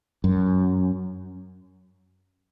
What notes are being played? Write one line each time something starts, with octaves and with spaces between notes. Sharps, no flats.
F#2